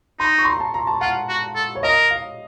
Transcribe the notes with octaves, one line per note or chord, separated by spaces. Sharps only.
D#4 C6
C#6
C6
A#5
A5
A#5
A5
F4 F#5
F#4
A4
C#5
A#4 D#5
F5